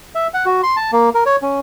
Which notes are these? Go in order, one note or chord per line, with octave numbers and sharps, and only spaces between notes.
E5
F#5
F#4
C6
A5
A#3
A#4
C#5
C#4